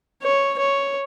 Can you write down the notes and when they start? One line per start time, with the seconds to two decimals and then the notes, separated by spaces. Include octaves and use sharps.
0.23 C#5
0.58 C#5